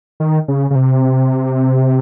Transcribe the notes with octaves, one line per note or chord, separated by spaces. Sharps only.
D#3
C#3
C#3
C3